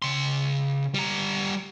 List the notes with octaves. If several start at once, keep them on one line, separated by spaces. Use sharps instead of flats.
C#3 C6
G3 A#5